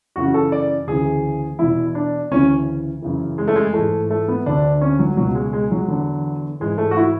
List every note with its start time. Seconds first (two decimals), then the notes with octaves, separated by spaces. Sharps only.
0.16 F#2 C#3 E3 F#4
0.34 A4
0.52 D5
0.87 D2 C#3 E3 G#4
1.59 E2 B2 E4
1.95 D4
2.31 D2 C#3 E3 C#4
3.02 F#2 C#3 E3
3.38 G#3
3.48 A3
3.56 G#3
3.74 G#2 E3 A3
4.10 A3
4.28 B3
4.46 D2 D3 D4
4.81 C#4
4.99 F#3
5.17 C#2 B2 F#3
5.35 G#3
5.53 G#3
5.71 F#3
5.88 E2 D3
6.60 G#2 E3 G#3
6.78 A3
6.91 F#4
6.97 E4